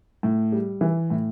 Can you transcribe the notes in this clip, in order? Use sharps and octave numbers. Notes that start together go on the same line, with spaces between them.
A2
G3
E3
A2